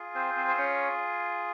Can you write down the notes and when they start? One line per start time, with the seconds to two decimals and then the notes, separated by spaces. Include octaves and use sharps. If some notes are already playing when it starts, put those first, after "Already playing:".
Already playing: F4 G#4
0.15 C4 C5
0.36 C4 C5
0.48 C5
0.58 C#4 C#5